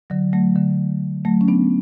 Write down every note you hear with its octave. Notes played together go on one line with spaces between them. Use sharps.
D3 F#3
F#3 A3
D3
F#3 A3
C#4
B3 D4